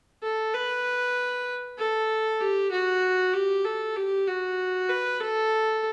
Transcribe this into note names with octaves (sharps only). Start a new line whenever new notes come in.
A4
B4
A4
G4
F#4
G4
A4
G4
F#4
B4
A4